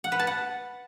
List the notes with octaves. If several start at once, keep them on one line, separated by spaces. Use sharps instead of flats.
F#5
B4
A5
F#5